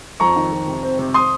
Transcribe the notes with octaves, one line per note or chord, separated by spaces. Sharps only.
F2 A#5 C#6
D#3
F2
C3
C4
C3
C6 D#6